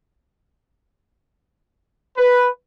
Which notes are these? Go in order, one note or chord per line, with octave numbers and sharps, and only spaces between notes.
B4